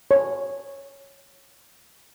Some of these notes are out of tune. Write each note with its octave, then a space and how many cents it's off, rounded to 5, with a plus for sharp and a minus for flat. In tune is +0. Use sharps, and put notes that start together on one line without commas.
C#5 -10